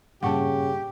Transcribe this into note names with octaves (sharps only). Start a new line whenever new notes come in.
G2 A#2 C#3 G4 F#5 A5 C#6